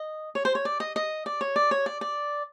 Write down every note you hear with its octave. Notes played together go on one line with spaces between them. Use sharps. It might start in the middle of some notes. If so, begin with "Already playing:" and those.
Already playing: D#5
C#5
C5
C#5
D5
D#5
D#5
D5
C#5
D5
C#5
D5
D5